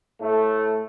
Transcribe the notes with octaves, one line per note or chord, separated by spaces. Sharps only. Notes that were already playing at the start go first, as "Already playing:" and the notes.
A2 A3